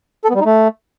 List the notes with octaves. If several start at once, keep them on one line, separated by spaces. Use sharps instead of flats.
A4
B3
G3
D#4
A3